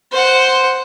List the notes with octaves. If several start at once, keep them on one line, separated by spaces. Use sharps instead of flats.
C5 F#5